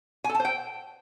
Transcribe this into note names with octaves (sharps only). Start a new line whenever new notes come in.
G#5
A4
A5
C5
G5